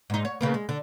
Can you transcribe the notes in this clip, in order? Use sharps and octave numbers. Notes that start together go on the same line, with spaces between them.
G#2 D#4
C#5
C#3 A#3 B3
G#3
D3